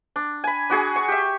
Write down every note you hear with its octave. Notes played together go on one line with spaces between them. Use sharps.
D4
G#5 B5
D4 F#4 G#4 G#5
C#6
G4 E5